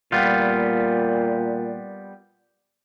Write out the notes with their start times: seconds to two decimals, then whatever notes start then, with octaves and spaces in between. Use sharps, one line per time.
0.12 A#2 G3 B3 F4